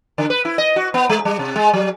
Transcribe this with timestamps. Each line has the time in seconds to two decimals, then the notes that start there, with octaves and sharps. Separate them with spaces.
0.18 D3
0.30 B4
0.45 E4
0.58 D#5
0.76 F#4
0.94 B3
1.09 G#3
1.25 G3
1.39 C3
1.56 G#3
1.73 F#3